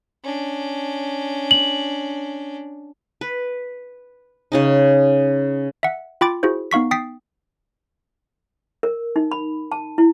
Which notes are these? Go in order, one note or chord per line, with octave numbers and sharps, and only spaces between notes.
C#4 D4
F#7
B4
C#3 C#4 D#4
E5 F#5
F4 G5 B5 D6 A6 D7
E4 F#4 G#4 C5
B3 D#4 F5 C#6 B6
G5 D#6 A6 B6 C7
A#4
D#4
B5
A5
E4